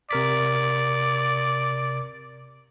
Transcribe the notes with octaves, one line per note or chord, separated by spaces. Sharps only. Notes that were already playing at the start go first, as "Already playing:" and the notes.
C3 A#4 D5 B6